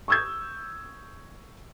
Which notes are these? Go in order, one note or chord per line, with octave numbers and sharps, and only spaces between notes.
C#6 D#6 E6 G6 G#6